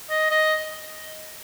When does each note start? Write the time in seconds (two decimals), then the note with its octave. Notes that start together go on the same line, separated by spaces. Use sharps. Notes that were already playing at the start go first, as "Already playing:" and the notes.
0.10 D#5
0.31 D#5